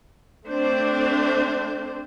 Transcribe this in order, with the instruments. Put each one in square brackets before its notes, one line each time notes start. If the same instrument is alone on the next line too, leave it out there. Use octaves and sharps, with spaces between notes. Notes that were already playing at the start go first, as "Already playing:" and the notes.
[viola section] A3 C4 D4 C5